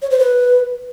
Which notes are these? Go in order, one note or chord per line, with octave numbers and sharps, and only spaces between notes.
C#5
C5
B4